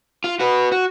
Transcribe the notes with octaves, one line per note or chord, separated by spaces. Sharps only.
F4
F#4 B4
F#4